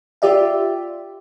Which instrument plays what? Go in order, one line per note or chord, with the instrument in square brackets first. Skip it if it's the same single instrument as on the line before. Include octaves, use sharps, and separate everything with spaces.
[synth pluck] F4 G4 D5 E5